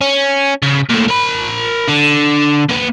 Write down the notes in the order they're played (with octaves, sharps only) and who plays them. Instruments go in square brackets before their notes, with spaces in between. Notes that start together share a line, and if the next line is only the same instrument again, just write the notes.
[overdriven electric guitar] C#4
C#3
A#2 A3
A#4 B5
D3
A#3 B4